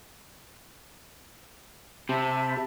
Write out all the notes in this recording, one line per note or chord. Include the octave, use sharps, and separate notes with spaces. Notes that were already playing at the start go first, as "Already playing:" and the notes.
C3 G4 E5 A5 B5